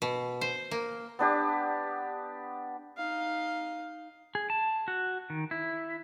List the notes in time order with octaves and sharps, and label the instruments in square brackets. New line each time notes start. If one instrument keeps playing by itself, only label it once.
[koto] B2
C5
A#3
[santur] B3 D4 G4
[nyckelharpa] D#4 F5
[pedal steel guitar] G#4
A5
F#4
D#3
E4